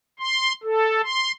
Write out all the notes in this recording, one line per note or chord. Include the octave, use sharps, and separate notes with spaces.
C6
A4
C6